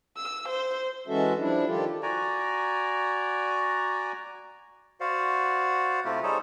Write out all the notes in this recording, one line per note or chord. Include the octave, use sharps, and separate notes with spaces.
E6
C5
E3 G#3 C#4 F#4 A4 E5
F3 G3 D4 E4
D#3 F4 G4 A4
F#4 D5 G#5 A#5
F#4 C5 D5 F5 F#5
C3 A3 C4 E4 F4 G4
G3 D#4 G#4 A4 C5 C#5